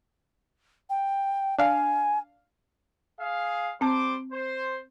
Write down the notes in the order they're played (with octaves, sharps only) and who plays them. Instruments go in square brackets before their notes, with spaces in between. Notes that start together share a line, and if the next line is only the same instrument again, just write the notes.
[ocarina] G5
[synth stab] D4 F5 [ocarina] G#5
[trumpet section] G#4 F5
[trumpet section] G3 C5 D6 [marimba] C4 A5
[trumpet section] C5